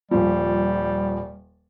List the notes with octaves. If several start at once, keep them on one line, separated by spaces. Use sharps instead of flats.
D#1 F3 G3